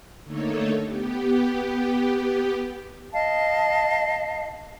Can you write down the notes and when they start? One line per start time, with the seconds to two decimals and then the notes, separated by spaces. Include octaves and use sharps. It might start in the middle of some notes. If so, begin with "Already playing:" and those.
0.24 D3 A3 A#3 D#4 A4 C#5
0.83 B3 G4
3.14 D#5 F5 A5